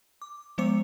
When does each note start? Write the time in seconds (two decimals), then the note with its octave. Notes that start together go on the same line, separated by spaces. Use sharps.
0.22 D6
0.58 F3 G#3 B3 C5 D6 C#7